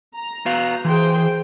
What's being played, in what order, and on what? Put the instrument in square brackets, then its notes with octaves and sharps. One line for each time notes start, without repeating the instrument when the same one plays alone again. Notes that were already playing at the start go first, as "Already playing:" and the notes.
[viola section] A#5
[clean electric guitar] B3 F#4 F5
[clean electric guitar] E3 [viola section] G#4 C5 G5